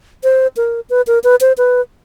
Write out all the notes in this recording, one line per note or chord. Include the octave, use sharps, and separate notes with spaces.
C5
A#4
B4
A#4
B4
C5
B4